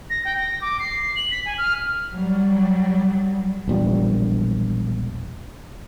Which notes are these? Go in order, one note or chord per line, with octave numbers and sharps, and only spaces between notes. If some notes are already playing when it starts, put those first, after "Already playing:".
A#6
G5
A#6
D6
C7
F#7
B6
G#5
F6
F#3 G3
E1 A#1 G3